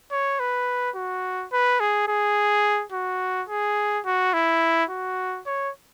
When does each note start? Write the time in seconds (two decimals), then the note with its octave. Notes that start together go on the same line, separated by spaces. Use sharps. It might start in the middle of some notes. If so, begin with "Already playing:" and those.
0.11 C#5
0.39 B4
0.95 F#4
1.52 B4
1.80 G#4
2.08 G#4
2.92 F#4
3.49 G#4
4.05 F#4
4.33 E4
4.90 F#4
5.46 C#5